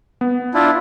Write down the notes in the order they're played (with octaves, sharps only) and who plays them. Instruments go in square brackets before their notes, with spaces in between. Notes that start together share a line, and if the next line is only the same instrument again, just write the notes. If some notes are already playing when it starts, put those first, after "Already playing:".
[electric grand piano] B3
[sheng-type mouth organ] D4 E4 F4